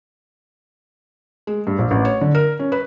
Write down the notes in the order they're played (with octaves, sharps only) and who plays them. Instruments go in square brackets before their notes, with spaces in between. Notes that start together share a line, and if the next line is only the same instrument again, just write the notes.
[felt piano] G#3
G2
A#1
A1
C#5
D3
A#4
C#4
B4